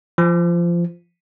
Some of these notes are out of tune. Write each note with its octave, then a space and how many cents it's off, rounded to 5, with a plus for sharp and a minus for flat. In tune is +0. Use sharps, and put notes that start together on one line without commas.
F3 -20